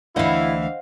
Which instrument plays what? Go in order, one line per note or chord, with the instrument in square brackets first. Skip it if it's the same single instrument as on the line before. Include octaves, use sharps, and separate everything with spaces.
[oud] D2 E3 [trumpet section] E4 [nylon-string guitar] C5 D#5 F#5 [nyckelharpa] F5